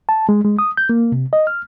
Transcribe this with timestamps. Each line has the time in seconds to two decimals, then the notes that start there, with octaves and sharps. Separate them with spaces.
0.09 A5
0.29 G#3
0.45 G#3
0.59 D#6
0.77 G6
0.89 A#3
1.12 C3
1.33 D#5
1.47 F6